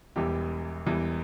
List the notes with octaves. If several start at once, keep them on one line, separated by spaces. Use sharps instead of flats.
E1 E2 E3 G3 G4
E1 E2 E3 G3